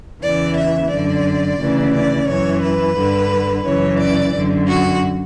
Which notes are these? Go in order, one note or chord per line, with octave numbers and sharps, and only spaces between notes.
E2 C#3 E3 D5
E5
F#2 D3 D5
D2 C#3 E3
D5
F#2 E3 C#5
B4
G2 D3
F#2 C#3 E3 C#5
D5
F#2 D3
F#4